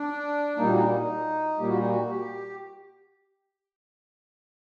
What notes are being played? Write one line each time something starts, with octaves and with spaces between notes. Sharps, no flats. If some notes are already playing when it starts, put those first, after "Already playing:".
Already playing: D4
A#2 G3 A#3 D#4
F#4
D#4
A#2 G3 A#3 G4
F#4
D#4
F#4
G4